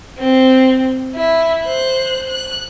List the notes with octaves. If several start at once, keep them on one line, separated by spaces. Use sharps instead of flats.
C4
E4
C5 F#6
F#6